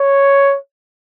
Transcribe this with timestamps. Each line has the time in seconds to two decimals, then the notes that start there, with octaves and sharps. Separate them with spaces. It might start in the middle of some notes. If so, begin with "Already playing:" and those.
Already playing: C#5